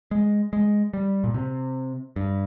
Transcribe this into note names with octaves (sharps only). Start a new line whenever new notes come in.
G#3
G#3
G3
A#2
C3
G2